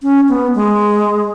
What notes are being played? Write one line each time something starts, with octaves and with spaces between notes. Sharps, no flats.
C#4
B3
G#3